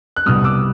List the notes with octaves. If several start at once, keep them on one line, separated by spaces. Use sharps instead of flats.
F#6
C2 B2 G3 D#6 F6
D6 E6